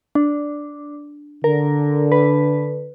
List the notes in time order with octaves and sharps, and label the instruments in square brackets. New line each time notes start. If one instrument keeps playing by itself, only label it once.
[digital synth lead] D4
[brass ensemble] D3 [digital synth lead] A#4
[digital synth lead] B4